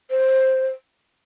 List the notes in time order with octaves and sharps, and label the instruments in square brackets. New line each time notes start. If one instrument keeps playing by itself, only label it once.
[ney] C5